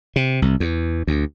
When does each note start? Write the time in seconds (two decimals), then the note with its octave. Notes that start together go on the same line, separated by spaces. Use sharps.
0.16 C3
0.42 C2
0.60 E2
1.07 D2